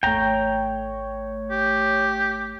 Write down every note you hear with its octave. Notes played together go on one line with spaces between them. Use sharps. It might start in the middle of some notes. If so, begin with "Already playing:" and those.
G#1 E2 A3 C#5 G5 A#5
G4